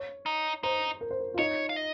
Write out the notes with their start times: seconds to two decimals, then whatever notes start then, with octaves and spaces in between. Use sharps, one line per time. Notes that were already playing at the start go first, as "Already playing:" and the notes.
Already playing: C#5
0.26 D#4
0.63 D#4 C5
1.01 A#4
1.11 C5
1.21 A#4
1.34 F4
1.38 D#4 C#5
1.69 F5
1.76 D#5